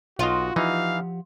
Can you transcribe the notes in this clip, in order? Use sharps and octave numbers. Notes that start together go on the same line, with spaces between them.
B1 F4 F#4 D#5
E3 F3 D#4 G4 F5 F#5